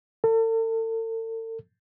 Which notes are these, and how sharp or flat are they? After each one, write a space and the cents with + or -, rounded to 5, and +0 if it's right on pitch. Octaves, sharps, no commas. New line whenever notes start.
A4 +40